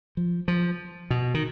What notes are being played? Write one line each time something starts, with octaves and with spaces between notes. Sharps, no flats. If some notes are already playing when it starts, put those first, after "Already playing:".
F3
F3
B2
D#3